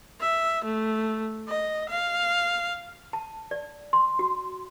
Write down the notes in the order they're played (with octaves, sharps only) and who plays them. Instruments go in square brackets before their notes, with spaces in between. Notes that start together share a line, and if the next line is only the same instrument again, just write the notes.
[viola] E5
A3
D#5
F5
[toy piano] A5
D5
C6
F#4